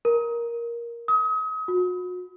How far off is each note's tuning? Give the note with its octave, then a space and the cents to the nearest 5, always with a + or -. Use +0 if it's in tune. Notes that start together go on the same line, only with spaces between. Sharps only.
A#4 +10
D#6 +35
F#4 -35